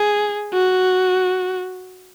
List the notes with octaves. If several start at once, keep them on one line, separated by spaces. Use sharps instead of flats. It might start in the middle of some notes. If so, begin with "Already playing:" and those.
Already playing: G#4
F#4